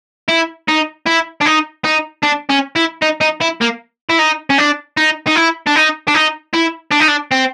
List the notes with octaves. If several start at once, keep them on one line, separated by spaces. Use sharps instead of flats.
E4
D#4
E4
D4
D#4
D#4
D4
C#4
E4
D#4
D#4
E4
A#3
E4
D#4
C#4
D4
D#4
D#4
E4
D4
D#4
D4
D#4
E4
D4
D#4
D4
C4